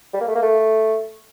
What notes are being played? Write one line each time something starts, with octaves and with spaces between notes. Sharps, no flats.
G3
A#3
A3
A#3
A3